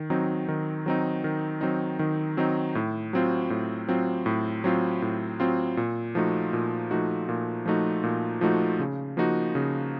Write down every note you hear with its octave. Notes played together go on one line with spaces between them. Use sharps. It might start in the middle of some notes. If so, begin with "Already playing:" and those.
Already playing: D#3
F#3 C4 D#4
D#3
F#3 C4 D#4
D#3
F#3 C4 D#4
D#3
F#3 C4 D#4
A2
F#3 C4 F4
A2
F#3 C4 F4
A2
F#3 C4 F4
A2
F#3 C4 F4
A#2
F3 A3 D#4 F#4
A#2
F3 A3 D#4 F#4
A#2
F3 A3 D#4 F#4
A#2
F3 A3 D#4 F#4
C#3
F3 A#3 D#4 F#4
C#3